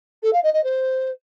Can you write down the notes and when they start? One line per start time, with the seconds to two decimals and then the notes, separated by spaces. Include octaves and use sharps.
0.23 A4
0.33 F5
0.43 D#5
0.54 D#5
0.64 C5